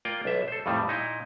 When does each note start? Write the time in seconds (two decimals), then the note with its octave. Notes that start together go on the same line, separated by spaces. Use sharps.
0.05 A#3 F4 D5 G5
0.25 B1 E5
0.48 A4 C5
0.66 F2 A2 D#3 G3
0.88 A#2 D#4 E4